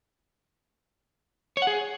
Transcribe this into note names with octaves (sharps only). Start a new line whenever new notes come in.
C#5
F#5
G#4